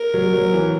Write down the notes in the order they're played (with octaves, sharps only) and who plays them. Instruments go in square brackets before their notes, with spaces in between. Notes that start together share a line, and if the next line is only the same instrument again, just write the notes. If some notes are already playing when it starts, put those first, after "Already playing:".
Already playing: [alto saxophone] A#4
[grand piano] F#3
F#3
E3